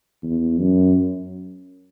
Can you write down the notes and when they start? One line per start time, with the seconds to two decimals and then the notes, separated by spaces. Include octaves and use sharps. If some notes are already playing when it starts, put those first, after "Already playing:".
0.23 E2
0.58 F#2